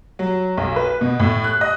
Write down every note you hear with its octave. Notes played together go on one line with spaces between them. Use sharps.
F#3
B1
B4
B2
A2
F#6
D#5